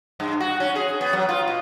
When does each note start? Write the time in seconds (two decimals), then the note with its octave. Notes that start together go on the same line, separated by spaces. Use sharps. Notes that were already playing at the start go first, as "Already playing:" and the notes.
0.20 G2
0.40 F#4
0.60 C#4
0.75 G#4
1.01 B3
1.13 F#3
1.29 F4
1.48 B2